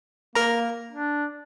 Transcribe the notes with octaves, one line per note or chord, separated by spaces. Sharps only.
A#3 A#4 A#5
D4